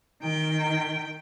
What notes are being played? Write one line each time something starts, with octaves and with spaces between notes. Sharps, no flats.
D#3 G5